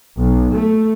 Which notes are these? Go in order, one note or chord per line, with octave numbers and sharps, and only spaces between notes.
B1
A3